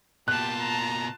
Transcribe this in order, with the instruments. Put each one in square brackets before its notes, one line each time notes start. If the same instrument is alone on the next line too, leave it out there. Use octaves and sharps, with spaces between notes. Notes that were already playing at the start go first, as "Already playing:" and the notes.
[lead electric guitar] B2 A#3 [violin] F4 A5 [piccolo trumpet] G4 [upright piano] F#6
[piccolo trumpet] A#5